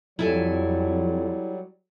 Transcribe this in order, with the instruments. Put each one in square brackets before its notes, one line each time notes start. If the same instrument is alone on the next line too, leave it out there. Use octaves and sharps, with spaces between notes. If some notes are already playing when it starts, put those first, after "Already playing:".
[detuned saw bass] F2 [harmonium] F#3 G3 [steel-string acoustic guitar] E4 A4 G#5